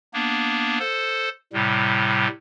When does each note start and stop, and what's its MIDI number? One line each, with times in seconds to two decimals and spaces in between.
0.14 0.79 58
0.14 0.79 59
0.14 0.79 62
0.79 1.29 69
0.79 1.29 72
1.53 2.27 45
1.53 2.27 48
1.53 2.27 55